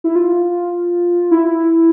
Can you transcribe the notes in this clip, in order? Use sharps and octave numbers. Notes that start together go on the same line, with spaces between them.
E4
F4
E4